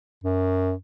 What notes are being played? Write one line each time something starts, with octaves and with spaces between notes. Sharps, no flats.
F#2